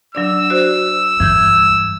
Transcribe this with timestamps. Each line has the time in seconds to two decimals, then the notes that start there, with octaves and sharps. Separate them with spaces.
0.15 F#3 D4 D5 E6
0.50 F#4 C5 D5
1.20 G2 E3 G6 G#6